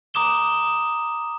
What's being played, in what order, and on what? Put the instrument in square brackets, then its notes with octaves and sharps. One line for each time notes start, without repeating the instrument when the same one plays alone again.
[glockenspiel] A#5 D6 D#6 E7 G7